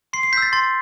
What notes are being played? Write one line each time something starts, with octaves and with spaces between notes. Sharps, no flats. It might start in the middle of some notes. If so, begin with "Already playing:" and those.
C6 C7
C7
E6 G6 A6 B6
C6 A6